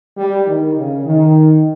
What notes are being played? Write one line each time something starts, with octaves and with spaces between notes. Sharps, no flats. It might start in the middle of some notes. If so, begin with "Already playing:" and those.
G3
D#3
C#3
D#3